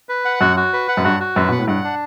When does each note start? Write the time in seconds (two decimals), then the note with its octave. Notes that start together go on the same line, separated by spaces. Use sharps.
0.09 B4
0.25 F#5
0.41 F#2 F#4
0.57 F#4
0.73 B4
0.88 F#5
0.97 F#2
1.04 G2 F#4
1.20 F#4
1.36 F#2 B4
1.49 B2 F#5
1.59 A2
1.67 G2 F#5
1.84 D4